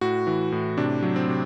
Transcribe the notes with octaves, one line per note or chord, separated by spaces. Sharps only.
A2 F#4
E3
A2
C3 D4
F#3
C4
C3